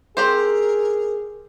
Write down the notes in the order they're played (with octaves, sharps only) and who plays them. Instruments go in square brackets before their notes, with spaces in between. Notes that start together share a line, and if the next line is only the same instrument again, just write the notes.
[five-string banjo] C4 G4 C5 [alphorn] G#4 [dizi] A#4